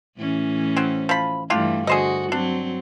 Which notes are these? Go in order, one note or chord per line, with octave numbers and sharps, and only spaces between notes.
A2 E3 C#4
F#3 C4
F3 B5
G2 E3 A3 D4 F4 G4
D3 F#4 G#4 C5 D#5
F#3 C4 D4